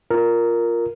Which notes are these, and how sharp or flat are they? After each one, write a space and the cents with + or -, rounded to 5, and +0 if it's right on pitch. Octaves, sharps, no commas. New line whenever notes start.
F4 +0 A#4 +0